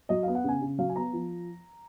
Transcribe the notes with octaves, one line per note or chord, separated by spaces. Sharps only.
F#3 D#5
B3 F5
F#5
C#3 G#5
C#3
F#3 F5
G#5
B3 A#5
F3